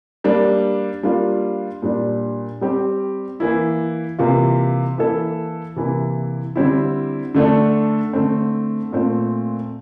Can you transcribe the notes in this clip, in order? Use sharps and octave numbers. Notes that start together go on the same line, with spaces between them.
G3 A#3 D4
G3 A#3 D4 F4
A#2 G3 D4
G3 C4 G4
E3 A#3 E4
C3 E3 A#3 F4
E3 A#3 E4 A4
C3 E3 A#3 E4
D3 G3 C4 E4
D3 A3 D4 A4
D3 A3 C4
A#2 A3 C4 F4